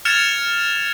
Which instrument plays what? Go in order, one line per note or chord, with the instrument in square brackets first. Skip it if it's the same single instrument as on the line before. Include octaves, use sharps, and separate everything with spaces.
[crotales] F6 G#6 A6 C#7 E7 F7